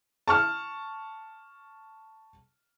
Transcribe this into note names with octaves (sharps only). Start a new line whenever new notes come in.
A5 C#6 F6